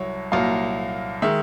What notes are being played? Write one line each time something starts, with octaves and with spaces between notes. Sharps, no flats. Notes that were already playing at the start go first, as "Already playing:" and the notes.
Already playing: C2 F#3 C#5
C2 A#2 F#3 F5
D#3 G#3 E5